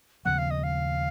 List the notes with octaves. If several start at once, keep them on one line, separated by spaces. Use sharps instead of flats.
D#2 C#3 F3 B3 F#5
F5
D#5
F5